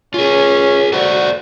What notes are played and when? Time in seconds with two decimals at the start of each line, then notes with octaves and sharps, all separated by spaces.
0.14 C#4 F4 G#4
0.93 F#4 A4 C5 D5